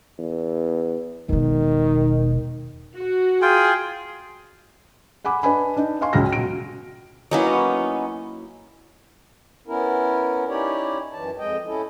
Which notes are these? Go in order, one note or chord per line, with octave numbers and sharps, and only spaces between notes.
E2
E1 B2 D#3
F#4
F4 G#4 G5
F#5 G#5 B5 D6
D4 B4 D#5 G#5 B5
D4 D#4
D#5 F5 G#5 C6 C#6
C#2 F#3 G#3 F6 A#6
B2 D7
F#3 A#3 B3 C#4 D#4 E4
B3 C#4 E4 A#4
C#4 D#4 E4 G4 C#5 D5
F#2 E3 A5
F2 G#3 D#5 G5
C#4 E4 A4